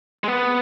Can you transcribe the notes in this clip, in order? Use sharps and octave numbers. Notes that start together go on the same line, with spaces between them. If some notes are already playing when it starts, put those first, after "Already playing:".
G#3
B3